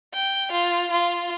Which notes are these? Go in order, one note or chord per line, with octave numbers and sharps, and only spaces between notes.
G5
F4
F4